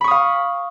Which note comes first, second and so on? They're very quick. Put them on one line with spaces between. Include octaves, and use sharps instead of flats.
B5 C#6 D#6 F5